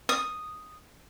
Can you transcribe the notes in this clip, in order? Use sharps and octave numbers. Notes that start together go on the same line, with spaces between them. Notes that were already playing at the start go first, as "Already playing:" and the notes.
D#6